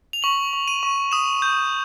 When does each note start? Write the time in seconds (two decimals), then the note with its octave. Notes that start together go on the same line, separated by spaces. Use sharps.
0.13 F7
0.22 C#6 F#7
0.53 C#6
0.68 D#7
0.83 C#6
1.12 D#6 E7
1.42 G6